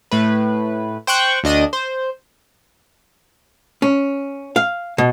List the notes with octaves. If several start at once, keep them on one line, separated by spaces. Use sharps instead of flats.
A2 B4
C5 G5 C#6 F#6
D2 D4 D#5 D#7
C5
C#4
F5
B2